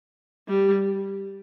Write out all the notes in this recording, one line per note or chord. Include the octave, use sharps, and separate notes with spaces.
G3